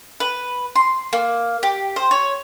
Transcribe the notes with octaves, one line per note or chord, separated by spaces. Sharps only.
B4
C6
A#3
G4
C5
C#5